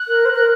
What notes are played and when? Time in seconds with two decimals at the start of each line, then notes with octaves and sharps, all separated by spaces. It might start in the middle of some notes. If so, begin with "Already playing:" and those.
Already playing: F#6
0.08 A#4
0.25 C5
0.30 A#4
0.35 F#6